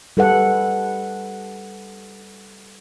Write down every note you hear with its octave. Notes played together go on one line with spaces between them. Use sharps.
G3 A4 B4 F#5